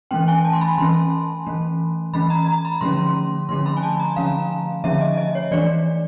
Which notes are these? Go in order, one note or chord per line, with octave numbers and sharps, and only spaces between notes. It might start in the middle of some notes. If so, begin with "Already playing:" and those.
E3 A3 C#4 G5
G#5
A5
C6
B5
E3 A3 C#4 C6
E3 A3 C#4
E3 A3 C#4 B5
A#5
A#5
B5
D3 F3 A3 C#4 C6
D3 F3 A3 C#4 C6
B5
G#5
A5
A#5
D3 F3 A3 C#4 F5
D3 F3 A3 C#4 E5
D#5
D#5
C#5
E3 A3 D4 D5